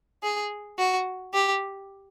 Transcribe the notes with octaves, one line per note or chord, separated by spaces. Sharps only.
G#4
F#4
G4